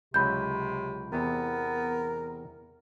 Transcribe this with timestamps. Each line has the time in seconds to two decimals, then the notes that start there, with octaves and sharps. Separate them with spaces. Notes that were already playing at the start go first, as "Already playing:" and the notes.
0.14 C#2 C3 F#3 B5 G6
1.12 E2 C3 B3 A#4